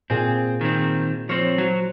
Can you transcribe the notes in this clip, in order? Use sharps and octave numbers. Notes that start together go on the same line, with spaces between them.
A#2 C4 G#4
D#3 C4
F3 C4 C5 C#5
F#3 F#4